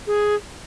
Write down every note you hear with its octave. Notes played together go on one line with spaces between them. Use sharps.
G#4